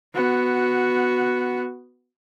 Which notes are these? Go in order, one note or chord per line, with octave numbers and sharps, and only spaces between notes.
B3 F#4